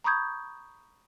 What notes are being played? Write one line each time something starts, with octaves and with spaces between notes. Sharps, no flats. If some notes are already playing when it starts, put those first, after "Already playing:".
A#5 B5 C#6 D#6 G6 G#6